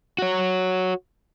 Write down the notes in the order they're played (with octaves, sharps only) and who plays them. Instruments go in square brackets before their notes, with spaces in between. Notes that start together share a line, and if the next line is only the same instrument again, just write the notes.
[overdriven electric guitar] F#4 C#5